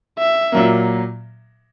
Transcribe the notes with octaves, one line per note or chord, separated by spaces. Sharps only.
E5
A#2 F#3 A#3